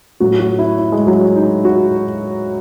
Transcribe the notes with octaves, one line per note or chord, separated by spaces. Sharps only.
A2 F#3 F#4
F#4
E4
E4
G#3
F#3
D#4
F#4